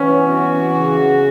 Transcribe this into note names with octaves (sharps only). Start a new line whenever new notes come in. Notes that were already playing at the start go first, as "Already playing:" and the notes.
Already playing: E3 B3 C#4
F#4
C#3